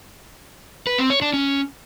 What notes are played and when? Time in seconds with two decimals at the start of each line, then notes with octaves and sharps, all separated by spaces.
0.87 B4
0.98 C4
1.10 C#5
1.22 D4
1.34 C#4